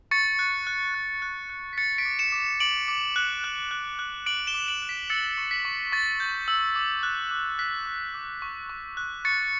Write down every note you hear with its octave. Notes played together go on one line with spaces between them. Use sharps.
C#6 A6 C#7
F#6
F#6
F#6
F#6
F#6
B6
F#6 A6 C#7
B6 D7
D6
C#7 E7
D6
D6 D7 F#7
D6
F#6
F#6
F#6
F#6
D6 D7 F#7
E7 G7
D6
D7 F#7
F#6
B6 D7
E6 A6 C#7
C#6
B6
C#6
C#6 A6
G6
E6
D6
F#6
D6
F#6 B6
D6
D6
C#6
C#6
F#6
C#6 A6 C#7